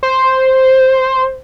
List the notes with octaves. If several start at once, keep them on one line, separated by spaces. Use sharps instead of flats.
C5